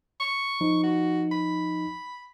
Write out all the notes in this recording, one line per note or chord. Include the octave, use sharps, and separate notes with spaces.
C#6
F3 D#4
F#4
B5